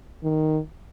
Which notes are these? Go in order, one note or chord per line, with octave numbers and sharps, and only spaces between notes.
D#3